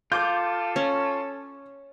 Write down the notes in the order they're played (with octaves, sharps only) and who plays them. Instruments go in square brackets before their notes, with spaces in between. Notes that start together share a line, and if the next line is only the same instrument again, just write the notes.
[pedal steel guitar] F4 [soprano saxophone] A4 [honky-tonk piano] D6 G6
[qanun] C#4